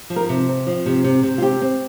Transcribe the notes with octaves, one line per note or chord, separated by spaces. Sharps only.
F3
A#4
C3
C4
F3
C3
C3
C3
F4
C4 G4
C4